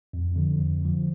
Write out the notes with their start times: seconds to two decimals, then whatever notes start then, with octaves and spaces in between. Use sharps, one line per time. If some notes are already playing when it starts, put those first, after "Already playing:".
0.13 F2
0.36 D3 F3
0.59 F2
0.82 D3 F3